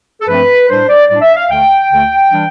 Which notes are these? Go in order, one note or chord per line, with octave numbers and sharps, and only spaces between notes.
A4
G2 F3 A3 C4 B4
A2 G3 D4 C5
D5
A2 G3 D4 D5
E5
F5
D2 D3 A3 G5
D2 D3 A3
E3 G3 D4